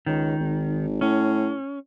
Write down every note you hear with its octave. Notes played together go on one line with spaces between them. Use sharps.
C#2 D#3
G#1
A2 C#4